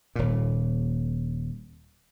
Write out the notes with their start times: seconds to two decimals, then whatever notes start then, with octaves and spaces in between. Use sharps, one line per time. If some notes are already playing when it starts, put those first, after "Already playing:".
0.15 D#1 A#2